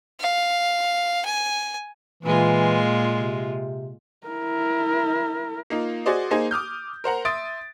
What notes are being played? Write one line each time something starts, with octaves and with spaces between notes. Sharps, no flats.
F5
G#5
A#2 E3 G#3 F4
C3
E4 A#4
A#3 D#4 F4
F#4 G#4 C5 D5 D#5
A#3 D#4 G#4 C5
D6 D#6 F6 G6
A#4 C5 F#5 A#5
E5 C6 D#6 A6 D7